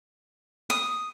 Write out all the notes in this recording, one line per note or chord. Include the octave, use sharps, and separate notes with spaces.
D#6